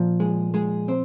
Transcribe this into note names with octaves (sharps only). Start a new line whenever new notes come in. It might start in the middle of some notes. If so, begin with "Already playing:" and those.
Already playing: A#2 F3
G#3 G#4
G#3 G#4
C4 C5